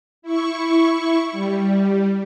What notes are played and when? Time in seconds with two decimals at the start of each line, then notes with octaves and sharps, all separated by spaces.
0.22 E4 C#6
1.31 G3